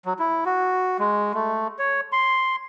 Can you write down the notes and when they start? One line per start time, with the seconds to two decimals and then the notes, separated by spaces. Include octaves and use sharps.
0.05 F#3
0.19 E4
0.45 F#4
0.99 G#3
1.34 A3
1.79 C#5
2.12 C6